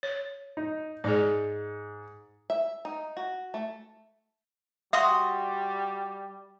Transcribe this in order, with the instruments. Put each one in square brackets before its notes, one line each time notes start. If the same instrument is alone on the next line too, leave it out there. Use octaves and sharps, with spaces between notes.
[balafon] C#5
[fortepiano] D#4
[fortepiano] G#2 [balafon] G#4 D5
[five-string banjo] E5
D#4
F#4
A3
[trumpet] G3 [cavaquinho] F#4 C6 D#6 [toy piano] E5